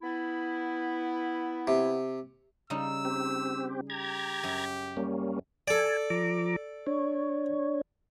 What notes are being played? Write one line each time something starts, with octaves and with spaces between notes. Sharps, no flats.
B3 E4
C3
C#3 G3 D#4 E6
C4 G4
G4 A#5 G#6
F#2
G3 A#3 C#4
A4 D5 G#5 A5
F3 A#5 D6
D4 C#5